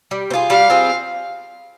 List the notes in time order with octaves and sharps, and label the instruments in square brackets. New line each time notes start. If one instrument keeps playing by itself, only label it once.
[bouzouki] G3
C4
F4 G#4
[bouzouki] G3 [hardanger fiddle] F5
[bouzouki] C4 F4 G#4